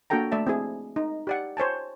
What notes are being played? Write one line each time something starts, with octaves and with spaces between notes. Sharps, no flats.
A#3 D4 F#4 A4 G5 A#5
A3 D5 E5 A5
C4 E4 G#4
D#4
G4 D5 F#5
C5 C#5 G#5 A5